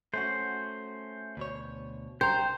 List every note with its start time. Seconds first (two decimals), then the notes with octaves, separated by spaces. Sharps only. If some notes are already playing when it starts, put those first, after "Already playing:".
0.14 A3 C#4 F#4 C5
1.37 D2 B2 C#5
2.21 C2 C5 G5 A#5